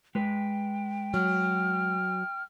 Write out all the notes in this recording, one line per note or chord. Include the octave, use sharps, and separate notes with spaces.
G#3 B4 G5
F#3 F6